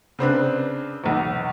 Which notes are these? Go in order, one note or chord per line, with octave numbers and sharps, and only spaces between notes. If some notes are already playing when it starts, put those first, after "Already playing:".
C#3 C4 D4 B4
B1 E2